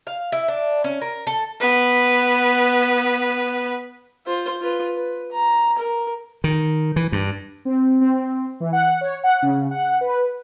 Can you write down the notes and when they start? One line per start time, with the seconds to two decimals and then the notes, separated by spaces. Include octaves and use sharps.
0.07 F5
0.32 E4
0.48 D4
0.84 C#4
1.01 A#4
1.27 A4
1.60 B3 B4
4.26 F4 C5
4.62 F4 B4
4.96 B4
5.32 A#5
5.78 A#4
6.44 D#3
6.96 E3
7.12 G2
7.65 C4
8.01 C4
8.60 E3
8.73 F#5
9.01 C#5
9.24 F#5
9.42 C#3
9.71 F#5
10.01 B4